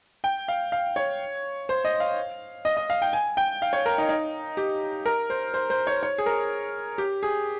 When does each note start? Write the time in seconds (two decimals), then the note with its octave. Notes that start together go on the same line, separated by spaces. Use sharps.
0.24 G5
0.48 F5
0.72 F5
0.96 C#5
1.69 C5
1.85 D#5
2.00 F5
2.65 D#5
2.77 D#5
2.90 F5
3.02 G5
3.13 G#5
3.37 G5
3.62 F5
3.73 C#5
3.86 A#4
3.98 D#4
4.09 D#4
4.57 G4
5.06 A#4
5.30 C5
5.54 C5
5.70 C5
5.87 C#5
6.03 C#5
6.18 G#4
6.26 A#4
6.98 G4
7.23 G#4